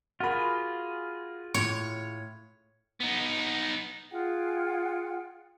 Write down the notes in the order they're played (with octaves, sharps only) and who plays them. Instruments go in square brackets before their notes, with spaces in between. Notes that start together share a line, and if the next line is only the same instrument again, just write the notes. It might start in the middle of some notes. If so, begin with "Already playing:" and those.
[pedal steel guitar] F4 G#4 [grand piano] F#4 A#4 B5
[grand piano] A2 [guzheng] C#5
[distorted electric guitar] B3 D#4
[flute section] F4 G#4 F#5 G5